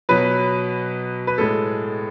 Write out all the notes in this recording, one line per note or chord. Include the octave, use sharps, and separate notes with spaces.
B2 F#3 B4
B4
A2 G#3 A4